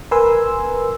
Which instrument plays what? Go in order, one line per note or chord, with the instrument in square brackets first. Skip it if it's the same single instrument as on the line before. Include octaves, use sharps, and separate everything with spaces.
[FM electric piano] A#4 B4 G#5 C6 E6